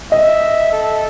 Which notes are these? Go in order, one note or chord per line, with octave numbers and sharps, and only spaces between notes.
D#5 E5
A4